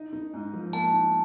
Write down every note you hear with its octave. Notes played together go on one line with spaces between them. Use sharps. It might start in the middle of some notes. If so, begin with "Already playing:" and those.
Already playing: D#4
D#4
G#2
F3
A#3 A5
D#4